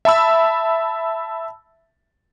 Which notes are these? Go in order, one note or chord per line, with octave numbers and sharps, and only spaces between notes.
E5 A5 B5 E6